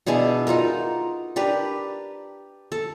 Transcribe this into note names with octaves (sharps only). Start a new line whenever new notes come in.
B2 D4 E4 G#4
D#4 F4 F#4 A#4
D4 G4 A#4 B4
A4